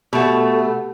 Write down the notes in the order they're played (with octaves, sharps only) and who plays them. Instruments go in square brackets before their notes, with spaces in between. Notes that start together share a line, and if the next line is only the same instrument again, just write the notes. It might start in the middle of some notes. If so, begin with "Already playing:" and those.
[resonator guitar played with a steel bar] B2 A3 [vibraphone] G4 A4 F#5